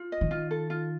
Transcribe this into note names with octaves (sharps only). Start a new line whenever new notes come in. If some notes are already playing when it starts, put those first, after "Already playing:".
Already playing: F4
D#5
D#3
F4
A4
F4